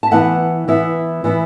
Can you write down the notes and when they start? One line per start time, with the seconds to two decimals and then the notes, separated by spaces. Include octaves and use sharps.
0.03 A5
0.11 E3 B3 E4 F#5
0.68 E3 B3 E4
1.24 E3 B3 E4